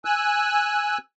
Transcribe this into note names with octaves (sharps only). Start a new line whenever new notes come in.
G#5 E6 F#6